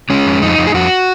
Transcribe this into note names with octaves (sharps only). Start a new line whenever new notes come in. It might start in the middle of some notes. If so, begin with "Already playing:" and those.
G#3 C#4
F2
F2 D#4
F2
G#4
F2 F#4